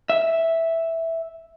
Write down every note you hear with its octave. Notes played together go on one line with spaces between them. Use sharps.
E5